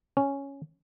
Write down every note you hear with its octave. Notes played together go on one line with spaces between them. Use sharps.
C#4